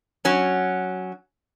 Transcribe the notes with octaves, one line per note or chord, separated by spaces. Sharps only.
F#3 C#4